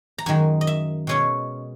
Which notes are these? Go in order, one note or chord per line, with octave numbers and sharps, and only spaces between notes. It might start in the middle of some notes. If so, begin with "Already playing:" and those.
A#5
F#2 D#3 G#3 G#5
D#5
E5
B2 G#3 C#4 C#5